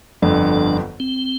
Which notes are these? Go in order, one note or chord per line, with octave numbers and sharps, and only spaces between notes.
G1 F2 D3 D4
C4